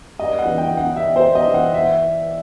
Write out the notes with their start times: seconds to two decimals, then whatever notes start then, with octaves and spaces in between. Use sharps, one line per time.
0.19 G2 D#5
0.39 F#5
0.45 E3
0.58 G5
0.71 E3
0.77 F#5
0.96 G2 E5
1.16 C5
1.22 G2
1.35 D#5
1.47 E3
1.54 F#5
1.74 E5